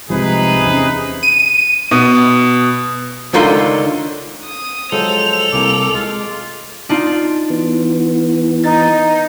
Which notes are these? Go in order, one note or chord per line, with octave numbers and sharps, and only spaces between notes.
C2 G#2 C3 F3 D#4 G#4 B4
E2 C#4
D#7
B2
C#2 D3 D#3 F4 C6
D#6
F3 F#3 G#3 A4 C5 F7
C2 A#3 G#5 D6
G#3 F4
D4 D#4 F4
E3 B3
D#4 A6